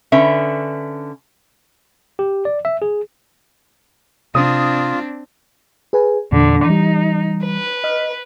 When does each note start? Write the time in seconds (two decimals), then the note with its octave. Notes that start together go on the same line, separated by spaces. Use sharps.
0.12 D3 C#4 B4 E5
2.19 G4
2.45 D5
2.65 E5
2.82 G#4
4.35 C3 C4 D4 F4 D#6
5.93 G#4 B4 G#5
6.32 E2 A#2 D3
6.66 E3 G3 D#4
7.45 B4
7.84 D#5 F6